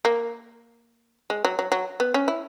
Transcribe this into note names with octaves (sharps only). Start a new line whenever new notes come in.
A#3
G#3
F#3
F#3
F#3
B3
C#4
E4